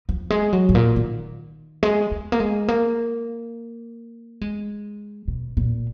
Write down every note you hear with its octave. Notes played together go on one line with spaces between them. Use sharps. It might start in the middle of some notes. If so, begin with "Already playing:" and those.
F3
G#3
F#3
G#2
A#2
D#3
G#3
G#3
A#3
G#3
A#3
G#3
B2
A#2